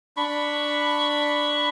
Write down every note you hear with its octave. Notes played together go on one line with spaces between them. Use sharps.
D4 B5 C#6